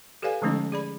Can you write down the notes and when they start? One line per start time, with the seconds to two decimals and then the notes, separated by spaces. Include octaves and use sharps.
0.22 G4 A4 B4 D5 F5 G#5
0.42 D3 F3 G#3 A3 C#4 D#4
0.72 G#4 D5 B5